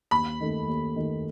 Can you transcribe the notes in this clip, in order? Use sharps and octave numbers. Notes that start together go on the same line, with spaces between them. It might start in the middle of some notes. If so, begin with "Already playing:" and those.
D#2 B5
D#3 A3
D#2
D#3 A3